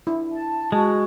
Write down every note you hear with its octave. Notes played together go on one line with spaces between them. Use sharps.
D4 E4
A5
G#3 F#4